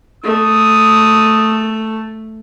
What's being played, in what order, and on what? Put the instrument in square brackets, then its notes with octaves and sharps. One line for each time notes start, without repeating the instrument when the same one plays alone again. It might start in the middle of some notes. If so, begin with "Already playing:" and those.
[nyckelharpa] A3 [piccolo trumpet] D#6